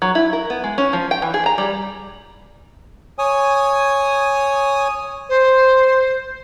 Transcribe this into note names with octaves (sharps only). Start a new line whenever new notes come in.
F#3
E4
A#4
B3
G#3
C#4
F3
G5
E3
G#4
A#5
G3
C#5 G#5 D#6
C5